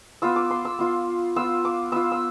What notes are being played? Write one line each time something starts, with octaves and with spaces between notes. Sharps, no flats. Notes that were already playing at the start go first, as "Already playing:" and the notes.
B3 F4 E6
D6
C6
E6
B3 F4
B3 F4 E6
D6
B3 F4 E6
E6